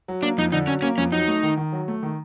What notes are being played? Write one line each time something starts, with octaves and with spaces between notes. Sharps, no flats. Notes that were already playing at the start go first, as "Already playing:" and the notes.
F#3
A#3 D4
F2 D#4
D3 D#4
F#3 C#4
A#3 C#4
F2 C#4
F#3 D#4
A3
D#3
D#3
F#3
A3
D#3